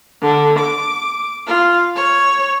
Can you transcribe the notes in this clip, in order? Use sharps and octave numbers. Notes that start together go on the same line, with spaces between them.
D3
D6
F4
C#5